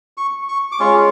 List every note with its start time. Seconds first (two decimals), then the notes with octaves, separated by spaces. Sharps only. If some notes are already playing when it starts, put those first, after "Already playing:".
0.17 C#6
0.49 C#6
0.72 D6
0.80 G#3 C#4 F4 C#6